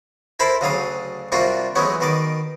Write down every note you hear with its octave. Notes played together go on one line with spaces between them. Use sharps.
E4 A4 A#4 C5 A5 B5
D2 C#3 F#3 D4 F5 D#6
C3 G3 A#3 D4 F4 F#4
E3 F#3 G#3 A3 B3 C#4
B2 D#3 A#4 D5 D6